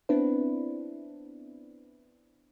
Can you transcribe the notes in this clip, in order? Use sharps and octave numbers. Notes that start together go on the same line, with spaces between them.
B3 C4 D4 E4 B4